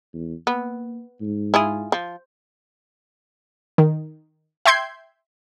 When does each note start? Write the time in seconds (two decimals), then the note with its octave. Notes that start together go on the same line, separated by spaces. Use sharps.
0.13 E2
0.47 A#3 B3
1.21 G#2
1.54 E4 F4 G#4
1.92 F3
3.78 D#3
4.66 E5 G5 C6 G6 G#6 C7